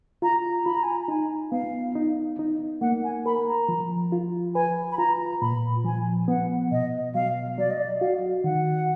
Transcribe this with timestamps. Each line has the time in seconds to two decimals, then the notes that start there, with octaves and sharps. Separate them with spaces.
0.22 F4 A#5
0.65 F4 B5
0.75 A#5
0.83 G#5
0.92 A#5
1.08 D#4 G#5
1.52 B3 F5
1.95 D#4
2.39 D#4
2.81 A#3 F#5
3.04 G#5
3.26 A#4 B5
3.47 A#5
3.69 F3
4.12 F4
4.55 B4 G#5
4.92 B5
4.98 F4 A#5
5.41 A#2 B5
5.84 F3 G#5
6.28 B3 F#5
6.72 B2 D#5
7.15 F#3 F5
7.58 F#3 D5
7.71 D#5
7.83 D5
8.01 F#4 F5
8.44 D#3 F#5